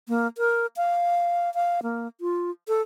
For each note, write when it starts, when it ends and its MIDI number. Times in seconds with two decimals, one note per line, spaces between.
0.08 0.27 58
0.38 0.67 70
0.77 1.53 77
1.54 1.80 77
1.83 2.08 58
2.21 2.51 65
2.68 2.82 69